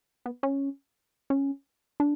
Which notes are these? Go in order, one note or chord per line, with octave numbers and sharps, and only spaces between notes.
B3
C#4
C#4
D4